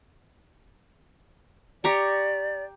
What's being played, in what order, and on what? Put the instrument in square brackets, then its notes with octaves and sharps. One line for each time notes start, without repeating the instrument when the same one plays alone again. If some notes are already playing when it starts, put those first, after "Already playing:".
[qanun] G4 A#5 C#6 [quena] D5